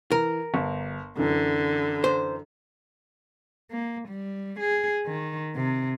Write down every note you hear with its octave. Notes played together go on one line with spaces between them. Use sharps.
E3 A#4
G1
F#2 D3 E3
C5
A#3
G3
G#4
D#3
C3